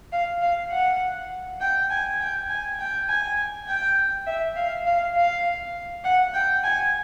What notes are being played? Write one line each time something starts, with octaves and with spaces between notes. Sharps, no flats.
F5
F5
F#5
G5
G#5
G5
G#5
G5
G#5
G5
E5
F5
F5
F5
F#5
G5
G#5